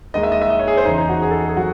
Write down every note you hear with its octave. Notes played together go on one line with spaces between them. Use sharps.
D#2 D#3 G#3 D#5
E5
D#5
E5
D#5
C#5
G#4
C5
E2 C#3 E3 D#4
D#4
F#4
G#4
A4
G#4
D#3 F#3 C4 F#4